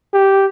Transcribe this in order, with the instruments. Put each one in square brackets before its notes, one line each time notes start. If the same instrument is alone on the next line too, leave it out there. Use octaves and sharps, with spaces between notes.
[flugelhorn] G4